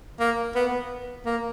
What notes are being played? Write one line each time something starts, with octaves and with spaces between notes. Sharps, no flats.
A#3
B3
A#3